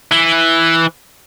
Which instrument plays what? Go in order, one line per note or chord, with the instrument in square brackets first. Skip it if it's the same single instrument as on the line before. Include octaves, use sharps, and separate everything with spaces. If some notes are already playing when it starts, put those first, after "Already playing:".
[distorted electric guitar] E3